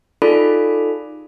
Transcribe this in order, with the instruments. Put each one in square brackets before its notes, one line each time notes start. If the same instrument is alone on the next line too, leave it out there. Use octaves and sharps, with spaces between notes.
[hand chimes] D#4 F4 G#4 A4 D5 B5